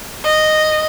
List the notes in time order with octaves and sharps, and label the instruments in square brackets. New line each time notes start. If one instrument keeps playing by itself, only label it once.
[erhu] D#5